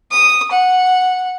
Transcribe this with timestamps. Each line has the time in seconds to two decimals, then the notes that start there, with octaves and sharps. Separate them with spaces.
0.11 D#6
0.51 F#5